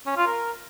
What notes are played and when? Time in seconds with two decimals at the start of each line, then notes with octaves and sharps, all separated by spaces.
0.06 C#4
0.17 F4
0.27 A#4